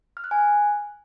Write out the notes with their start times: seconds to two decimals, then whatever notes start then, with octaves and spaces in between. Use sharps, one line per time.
0.17 F6
0.24 F#6
0.31 G#5
0.39 F#6